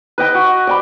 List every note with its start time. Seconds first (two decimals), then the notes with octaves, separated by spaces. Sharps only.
0.18 B4 D#5 G5
0.35 F#4
0.67 D5 G5 B5